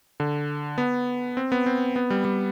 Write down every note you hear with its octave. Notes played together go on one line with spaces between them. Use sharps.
D3
B3
C4
B3
C4
B3
G3
G3